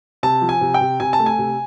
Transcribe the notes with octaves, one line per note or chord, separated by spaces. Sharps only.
C3 A5
F3
G#5
C3
G5
C3
C3 G#5
A5
A3
G#5
C3